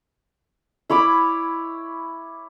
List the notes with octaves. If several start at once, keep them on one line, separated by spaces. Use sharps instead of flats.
E4 C#5 B5 D6